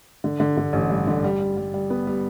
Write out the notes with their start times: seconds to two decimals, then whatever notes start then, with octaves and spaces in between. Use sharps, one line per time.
0.24 D3
0.40 D3
0.57 D3
0.73 A1
0.90 G2
1.07 D3
1.24 G3
1.40 G3
1.57 G3
1.74 G3
1.90 B3
2.07 G3